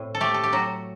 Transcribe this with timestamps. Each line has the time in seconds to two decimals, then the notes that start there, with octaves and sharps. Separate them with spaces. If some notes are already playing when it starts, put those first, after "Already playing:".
Already playing: A2 C4
0.15 A4
0.21 A3 G4
0.34 A4
0.44 G4
0.53 F#3 F#4